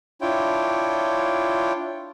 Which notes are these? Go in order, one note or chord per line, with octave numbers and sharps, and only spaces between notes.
D4 E4 F4 C#5 G5